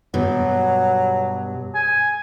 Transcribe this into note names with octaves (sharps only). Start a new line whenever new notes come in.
G2 B2 F#3
G#5